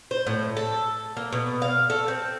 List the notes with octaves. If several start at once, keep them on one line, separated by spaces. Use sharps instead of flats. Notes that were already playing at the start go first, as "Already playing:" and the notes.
C5
A2
A4
A#3
B2
F5
A4
C4